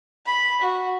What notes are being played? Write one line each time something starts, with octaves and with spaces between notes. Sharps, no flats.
B5
F#4